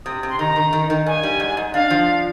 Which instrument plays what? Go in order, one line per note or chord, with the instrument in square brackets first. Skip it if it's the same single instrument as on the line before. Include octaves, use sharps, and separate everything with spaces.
[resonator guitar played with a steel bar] C3 [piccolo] D#6
[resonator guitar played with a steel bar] C3
[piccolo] C6
[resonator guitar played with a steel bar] D#3 [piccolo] A#5
[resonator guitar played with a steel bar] D#3
D#3
D#3
[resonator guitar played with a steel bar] G2 [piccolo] G#5
[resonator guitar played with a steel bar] G3
G#2
G#2
[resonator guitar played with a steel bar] D4 [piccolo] F5
[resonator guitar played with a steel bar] F3